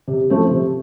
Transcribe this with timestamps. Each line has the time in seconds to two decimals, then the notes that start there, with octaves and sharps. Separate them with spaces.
0.08 C3
0.30 F3 A3 C4
0.51 C3